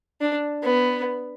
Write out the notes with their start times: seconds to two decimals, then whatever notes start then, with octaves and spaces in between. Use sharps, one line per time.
0.21 D4
0.63 B3